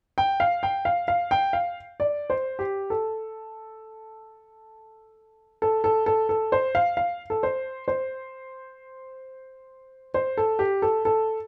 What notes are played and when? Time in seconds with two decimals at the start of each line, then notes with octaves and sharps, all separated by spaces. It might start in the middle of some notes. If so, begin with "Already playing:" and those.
0.18 G5
0.40 F5
0.63 G5
0.85 F5
1.08 F5
1.31 G5
1.53 F5
2.00 D5
2.30 C5
2.59 G4
2.90 A4
5.62 A4
5.84 A4
6.06 A4
6.29 A4
6.52 C5
6.75 F5
6.97 F5
7.30 A4
7.43 C5
7.88 C5
10.14 C5
10.37 A4
10.59 G4
10.82 A4
11.05 A4